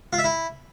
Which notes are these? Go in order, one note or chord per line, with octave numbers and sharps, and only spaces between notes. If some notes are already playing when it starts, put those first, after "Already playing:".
F4
E5
E4